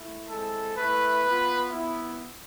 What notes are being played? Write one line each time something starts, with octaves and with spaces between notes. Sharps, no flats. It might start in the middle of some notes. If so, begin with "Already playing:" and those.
Already playing: A3 E4
G#3 C4 E4 A4
A3 E4 B4
B3 F4
B3 E4